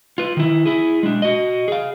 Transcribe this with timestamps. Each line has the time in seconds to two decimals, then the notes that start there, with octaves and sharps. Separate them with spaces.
0.18 F4 B4
0.37 D#3 E4
0.66 E4 G#4
1.03 G#3 D4
1.22 F#4 D#5
1.68 G#4 F5